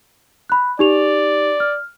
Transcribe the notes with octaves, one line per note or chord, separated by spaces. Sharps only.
B5 F#6
D#4 G4 D5 F7
F6